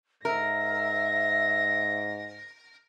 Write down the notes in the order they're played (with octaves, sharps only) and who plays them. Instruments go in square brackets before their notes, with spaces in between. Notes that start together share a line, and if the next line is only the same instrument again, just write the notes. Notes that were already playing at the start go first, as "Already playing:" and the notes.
[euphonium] G#2 [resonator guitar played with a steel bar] A#4 [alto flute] E5 [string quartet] A#6